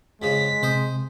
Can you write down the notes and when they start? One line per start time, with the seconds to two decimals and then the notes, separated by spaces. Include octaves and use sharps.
0.22 F2 C#3 G#3 B6
0.63 C3 C5 D#5